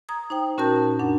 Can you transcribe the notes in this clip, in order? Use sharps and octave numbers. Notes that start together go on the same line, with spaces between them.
A#5 D#6 G#6
D#4 C5 G5
A#2 C#4 F#4 A#4 A5 G6
F#2 D4 F#5